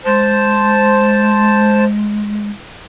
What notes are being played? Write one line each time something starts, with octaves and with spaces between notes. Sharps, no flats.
G#3 C5 A5